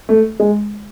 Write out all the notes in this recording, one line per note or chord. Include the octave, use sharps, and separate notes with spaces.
A3
G#3